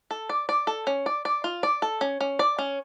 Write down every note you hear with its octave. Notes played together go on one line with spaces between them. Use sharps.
A4
D5
D5
A4
C#4
D5
D5
F4
D5
A4
C#4
C#4
D5
C#4